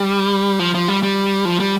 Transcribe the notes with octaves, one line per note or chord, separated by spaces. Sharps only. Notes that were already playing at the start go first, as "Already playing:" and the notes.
Already playing: G3
F3
F3
G3
G3
F3
G3